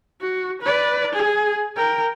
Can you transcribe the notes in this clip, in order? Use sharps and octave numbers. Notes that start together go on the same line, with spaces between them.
F#4
B4 D5
G#4
A#4 G5